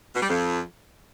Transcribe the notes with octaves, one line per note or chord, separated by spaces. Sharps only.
B2
G3
F2